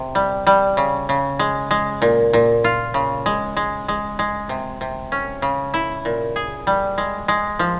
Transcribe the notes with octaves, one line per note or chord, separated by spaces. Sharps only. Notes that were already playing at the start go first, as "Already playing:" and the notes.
Already playing: C3
G3
G3
C#3
C#3
G#3
G#3
A#2
A#2
F4
C#3
G#3
G#3
G#3
G#3
C3
C3
C#4
C#3
E4
A#2
G#4
G3
G#3
G#3
F3